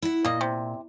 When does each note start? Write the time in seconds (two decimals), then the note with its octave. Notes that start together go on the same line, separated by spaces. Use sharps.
0.02 E4 F#5
0.25 A#2 A#3 D#5
0.41 C3